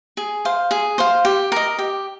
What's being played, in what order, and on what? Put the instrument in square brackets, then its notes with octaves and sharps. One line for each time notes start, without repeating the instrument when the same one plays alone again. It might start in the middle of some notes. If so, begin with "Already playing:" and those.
[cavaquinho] G#4
C5 F5
G#4
C5 F5
G4
A#4 D#5
G4